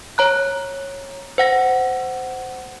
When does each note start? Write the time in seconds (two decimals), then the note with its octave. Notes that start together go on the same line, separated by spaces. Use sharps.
0.18 C#5 A#5 F#6
1.38 C5 F#5 A#6